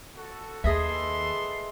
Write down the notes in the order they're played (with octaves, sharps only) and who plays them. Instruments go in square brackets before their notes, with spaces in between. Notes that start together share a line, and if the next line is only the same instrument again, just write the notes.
[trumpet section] F#4 A4
[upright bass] D#2 [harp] G#4 D#5 E5 [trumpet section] A4 B4 C6